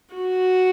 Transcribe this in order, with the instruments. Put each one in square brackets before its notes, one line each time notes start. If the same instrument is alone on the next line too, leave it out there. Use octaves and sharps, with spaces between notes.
[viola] F#4